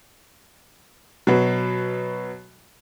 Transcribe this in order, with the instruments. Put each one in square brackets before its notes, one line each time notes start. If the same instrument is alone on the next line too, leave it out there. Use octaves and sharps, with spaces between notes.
[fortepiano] B2 F#3